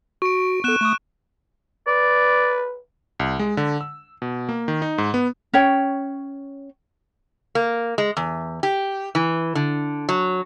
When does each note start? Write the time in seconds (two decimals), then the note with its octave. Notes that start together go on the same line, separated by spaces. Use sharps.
0.22 F#4 C#6 D7
0.64 B3 A4 F#6 E7
0.81 A3 C#6 D#6
1.87 B4 D5
3.20 C2
3.39 G#3
3.57 D3
3.81 E6
4.22 B2
4.49 A#3
4.68 D#3
4.82 D#4
4.98 G#2
5.14 B3
5.53 C#4 C#5 G5
7.55 A#3
7.98 G#3
8.17 E2
8.63 G4
9.15 E3
9.55 D3
10.09 F#3